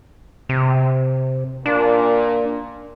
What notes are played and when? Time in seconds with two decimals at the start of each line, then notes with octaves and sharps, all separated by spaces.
0.49 C3
1.66 A#2 D4